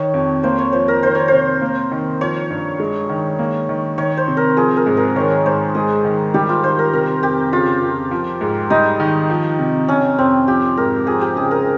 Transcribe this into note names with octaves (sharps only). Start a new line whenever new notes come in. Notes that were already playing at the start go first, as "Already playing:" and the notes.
Already playing: D#3 C#5
F2
A#3 C5
C#5
F3 C5
A#4
D#3 C5
C#5
C3 C5
A#3
D#3
F3 C#5
G2
G#3
D#3
A#3
D#3
D#3 C#5
C5
C3
A#4
F3 G#4
A#4
G#2
A#4
D#3 C#5
G#2 C5
G#3 G#4
D#3
G3 G4
F4
D#3 C5
A#4
C3 A#4
F2 G4
C#3 F4
F2
F3
G#2
G3 D#4
D#3
F3
C3
C3 C#4
F2 C4
F3 G4
G#2 A#4
F3 G#4
G4
C#3 G#4
A#4